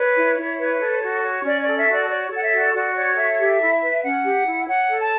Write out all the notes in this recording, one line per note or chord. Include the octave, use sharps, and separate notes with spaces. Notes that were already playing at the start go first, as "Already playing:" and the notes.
Already playing: B4 C#5
E4
E4
B4
A4
F#4
C#5
C#4 D5
D5
A4
E5
F#4
D5
C#5 D5
A4 F#5
E5
F#4
D5
F#4 D5
C#5 D5
A4 E5
G4
E4
B4
C#4 F#5
G4
E4
C#5 F#5
A4
A5